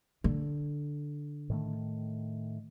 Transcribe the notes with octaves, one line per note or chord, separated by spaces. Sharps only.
D3
A2 D#3 A3